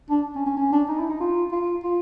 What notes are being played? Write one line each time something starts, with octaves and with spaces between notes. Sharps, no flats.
D4
C#4
C#4
C#4
D4
D#4
E4
D#4
F4
F4
F4